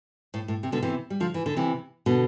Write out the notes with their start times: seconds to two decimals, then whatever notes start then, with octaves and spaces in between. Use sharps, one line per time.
0.34 A2
0.48 A2
0.63 C3
0.72 B2 D3
0.83 C3 E3
1.10 G3
1.20 D3 F3
1.34 E3
1.46 D3
1.56 C3 E3
2.06 B2 D3